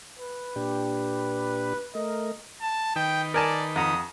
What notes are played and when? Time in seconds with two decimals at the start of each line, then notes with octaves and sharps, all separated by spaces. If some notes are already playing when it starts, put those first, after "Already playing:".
0.19 B4
0.56 A#2 D4 G4
1.95 A3 A#4 D#5
2.62 A5
2.96 D#3 D#4 B4 G5
3.34 A#4 D5 G#5 A5
3.76 F2 F#5 A#5 D#6